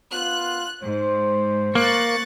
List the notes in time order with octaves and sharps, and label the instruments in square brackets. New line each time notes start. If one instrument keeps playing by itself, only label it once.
[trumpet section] B3 F4 [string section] F#6
[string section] G#2 [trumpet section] C5
[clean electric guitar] A#3 [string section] C#6 F#6 A6